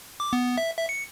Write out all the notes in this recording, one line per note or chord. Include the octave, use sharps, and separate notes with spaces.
D6
B3
E5
E5
C#7